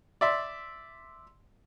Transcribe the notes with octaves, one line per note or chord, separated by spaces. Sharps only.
D5 E5 C6